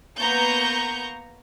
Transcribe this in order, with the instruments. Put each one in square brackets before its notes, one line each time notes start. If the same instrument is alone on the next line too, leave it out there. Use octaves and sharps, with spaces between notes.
[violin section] A#3 B3 A#5 C#6 G6